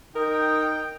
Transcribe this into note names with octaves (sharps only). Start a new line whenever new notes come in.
D#4 A#4 G5 D#6